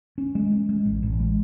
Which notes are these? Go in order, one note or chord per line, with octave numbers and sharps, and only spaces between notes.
C#4
G#3
C#4
G#3
A1
A1
G#3